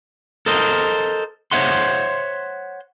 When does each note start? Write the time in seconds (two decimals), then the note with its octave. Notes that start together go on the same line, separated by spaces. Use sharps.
0.46 A4 A#4 C5 D#5
1.51 C5 C#5 D#5 E5 F#5 C6